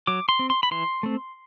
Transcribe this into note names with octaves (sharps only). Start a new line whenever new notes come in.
F#3 D6
C6
C4
C6
B5
E3 C6
A3 C4